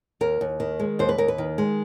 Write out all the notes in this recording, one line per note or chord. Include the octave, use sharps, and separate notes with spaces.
D#2 A#4
D#2
D#3
G#3
D#2 C5
B4
D#2 A#4
B4
D#3
G#3